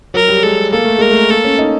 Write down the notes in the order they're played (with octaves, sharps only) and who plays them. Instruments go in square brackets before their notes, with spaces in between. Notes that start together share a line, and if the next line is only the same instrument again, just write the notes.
[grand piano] F#3 [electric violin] A#4
[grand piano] G3
[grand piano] G#3 [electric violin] A4
[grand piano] A#3 [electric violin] A4
[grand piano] A3
[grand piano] G#3 [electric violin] A#4
[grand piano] A3
[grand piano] A#3 [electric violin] A4
[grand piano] C#4
D#4